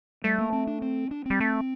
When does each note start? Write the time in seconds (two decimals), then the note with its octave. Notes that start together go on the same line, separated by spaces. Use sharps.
0.24 G3 A3
0.39 A#3
0.52 C4
0.67 D4
0.82 C4
1.11 D4
1.26 G3 C4
1.40 A3